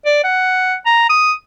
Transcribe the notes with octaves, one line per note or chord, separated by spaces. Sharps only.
D5
F#5
A#5
D#6